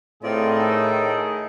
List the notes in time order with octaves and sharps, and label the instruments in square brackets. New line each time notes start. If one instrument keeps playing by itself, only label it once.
[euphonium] A2 [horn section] D#3 G#4 D#5 [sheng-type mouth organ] C4 F4 D5
[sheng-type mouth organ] D#4 A4